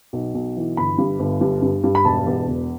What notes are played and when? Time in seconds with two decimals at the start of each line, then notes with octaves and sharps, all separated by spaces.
0.13 B1
0.35 B1
0.57 E3
0.77 G1 B5
0.98 G2
1.19 G1
1.41 G2
1.62 G2
1.84 G2
1.95 B5
2.05 E1 A5
2.27 E2
2.48 E1